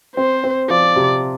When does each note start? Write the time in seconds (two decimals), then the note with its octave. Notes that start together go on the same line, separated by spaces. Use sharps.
0.16 C4 C5
0.44 C4
0.70 F3 D5
0.96 C3